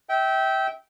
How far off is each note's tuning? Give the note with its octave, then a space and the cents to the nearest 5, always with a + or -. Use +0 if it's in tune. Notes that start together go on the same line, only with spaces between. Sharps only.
E5 -25 G5 -15